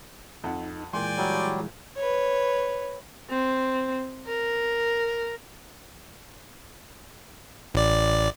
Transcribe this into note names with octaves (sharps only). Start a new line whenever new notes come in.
F2 D#4 F#5
A#2 E3 G#3 D5 G5 G#5 C6
F#3 G3
B4 C#5
C4
A#4
A1 D5